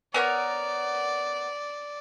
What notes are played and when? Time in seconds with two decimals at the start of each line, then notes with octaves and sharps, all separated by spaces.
0.14 B3 A#4 C#5 D5